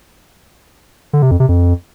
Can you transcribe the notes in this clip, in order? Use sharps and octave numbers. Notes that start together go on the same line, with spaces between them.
D3
C3
F2
C3
F2